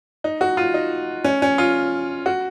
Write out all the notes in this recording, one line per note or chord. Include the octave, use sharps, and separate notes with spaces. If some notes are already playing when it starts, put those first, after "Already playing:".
D#4
F#4
F4
D#4
C#4
C#4
F4
F#4